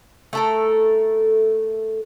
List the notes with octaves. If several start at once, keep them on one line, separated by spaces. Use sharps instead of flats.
A3 A4 A#4